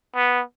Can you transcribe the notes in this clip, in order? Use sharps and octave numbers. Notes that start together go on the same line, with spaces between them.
B3